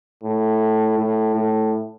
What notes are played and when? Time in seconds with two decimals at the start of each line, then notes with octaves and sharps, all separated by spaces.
0.23 A2
0.98 A2
1.35 A2